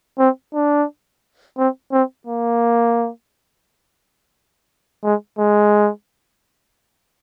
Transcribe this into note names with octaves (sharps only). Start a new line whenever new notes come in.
C4
D4
C4
C4
A#3
G#3
G#3